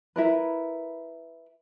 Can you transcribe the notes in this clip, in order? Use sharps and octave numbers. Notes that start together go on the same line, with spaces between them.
E4 A#4 B4